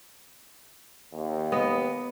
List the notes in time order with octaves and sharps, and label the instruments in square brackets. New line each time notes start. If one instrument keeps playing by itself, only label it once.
[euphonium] D#2
[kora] B3 D#5